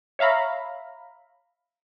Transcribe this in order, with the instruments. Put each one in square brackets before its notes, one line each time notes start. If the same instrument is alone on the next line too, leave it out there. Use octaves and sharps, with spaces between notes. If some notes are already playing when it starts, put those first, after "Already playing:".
[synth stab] C#5 E5 F5 A#5 B5